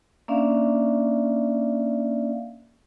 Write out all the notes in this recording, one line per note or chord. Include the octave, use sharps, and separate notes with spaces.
A#3 C#4 D4 D5 E5 F5